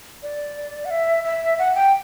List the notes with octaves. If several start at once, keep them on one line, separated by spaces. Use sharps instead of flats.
D5
F#5
E5
E5
F#5
G5